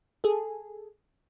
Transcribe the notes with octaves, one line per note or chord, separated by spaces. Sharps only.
G#4 A4